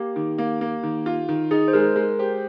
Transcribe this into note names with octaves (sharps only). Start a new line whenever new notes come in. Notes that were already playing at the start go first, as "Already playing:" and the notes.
Already playing: A#3 G4
D#3
A#3
A#3
D#3
F4
D#3
D#4 G#4
C5
G#3 A#4
G#3 A#4
G4 C5